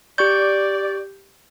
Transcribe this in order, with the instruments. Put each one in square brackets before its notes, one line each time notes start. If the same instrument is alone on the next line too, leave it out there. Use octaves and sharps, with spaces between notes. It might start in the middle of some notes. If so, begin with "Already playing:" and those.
[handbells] G4 C#6 G6 [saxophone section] D5